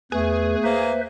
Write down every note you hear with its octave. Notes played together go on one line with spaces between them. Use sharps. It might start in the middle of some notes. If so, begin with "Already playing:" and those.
E2 A3 G#4 B4
A#3 B4 C5 E5